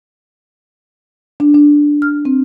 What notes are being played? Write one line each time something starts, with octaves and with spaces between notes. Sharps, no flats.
D4
D4
F6
C4